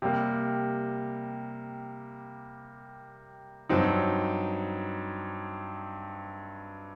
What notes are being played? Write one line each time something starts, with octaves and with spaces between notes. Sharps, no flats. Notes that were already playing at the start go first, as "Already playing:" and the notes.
C3 G3 A#3
G2 F#3 C4 D#4